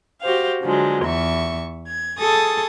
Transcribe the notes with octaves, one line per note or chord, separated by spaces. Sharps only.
F#4 G4 C5 F5
D3 F3 F#3 G#3
E2 E5 C#6
G#6
G#4 A4 C#6 D#6 A6